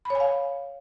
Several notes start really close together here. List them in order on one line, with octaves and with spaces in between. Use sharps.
B5 C#5 G#5 F5